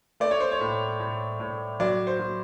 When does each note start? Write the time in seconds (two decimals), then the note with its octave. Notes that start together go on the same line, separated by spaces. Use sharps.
0.20 A3 D5
0.31 C#5
0.40 C5
0.52 C#5
0.60 A2
1.00 A2
1.40 A2
1.80 F#3 D5
2.07 C5
2.19 F#3